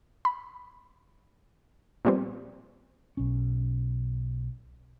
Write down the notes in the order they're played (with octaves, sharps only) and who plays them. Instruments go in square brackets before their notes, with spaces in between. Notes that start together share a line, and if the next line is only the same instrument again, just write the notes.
[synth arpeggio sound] B5
A#2 F3 G3 B3 C4
[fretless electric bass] B1 C#4